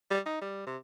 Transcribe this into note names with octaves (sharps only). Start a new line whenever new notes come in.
G3
D#4
G3
C3